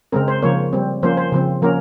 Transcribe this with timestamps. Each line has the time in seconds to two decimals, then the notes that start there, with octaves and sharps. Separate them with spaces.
0.12 C#3 G#3 C4 A#4
0.28 C5
0.42 C#3 F3 A#3 C#5
0.73 G3 C4
1.03 F3 A#3 C#4 C5
1.17 C5
1.32 C#3 F3 C4
1.62 F3 A#3 C#4 A#4